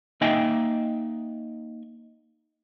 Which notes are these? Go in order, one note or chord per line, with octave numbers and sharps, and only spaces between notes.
A#3 D#4 D#5 E5 G5 G#5